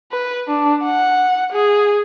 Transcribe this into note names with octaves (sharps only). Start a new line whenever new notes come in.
B4
D4
F#5
G#4